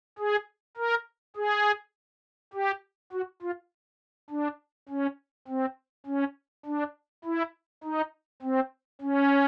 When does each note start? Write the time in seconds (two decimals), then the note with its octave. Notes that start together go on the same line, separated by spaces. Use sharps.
0.18 G#4
0.77 A#4
1.36 G#4
2.54 G4
3.13 F#4
3.42 F4
4.30 D4
4.89 C#4
5.48 C4
6.06 C#4
6.66 D4
7.24 E4
7.83 D#4
8.42 C4
9.01 C#4